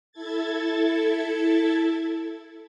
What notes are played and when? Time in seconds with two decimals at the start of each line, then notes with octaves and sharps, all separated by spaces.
0.12 E4 A4 G#6 A6